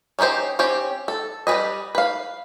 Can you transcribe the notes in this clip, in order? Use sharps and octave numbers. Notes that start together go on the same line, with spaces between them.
C#4 D#4 E4 G4 C5
C4 C#4 G4
A4
G3 G4 G#4 B4 D#5
B4 F5